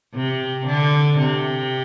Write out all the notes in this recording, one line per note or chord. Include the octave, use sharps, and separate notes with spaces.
C3
D3
C3